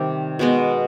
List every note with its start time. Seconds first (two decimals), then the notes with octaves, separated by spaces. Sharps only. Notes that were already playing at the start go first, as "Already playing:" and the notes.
Already playing: C3 D#3 G3 D5
0.39 B2 G#3 B3